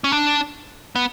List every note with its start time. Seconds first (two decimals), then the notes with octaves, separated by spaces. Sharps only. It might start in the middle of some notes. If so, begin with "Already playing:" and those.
0.04 C#4
0.12 D4
0.95 B3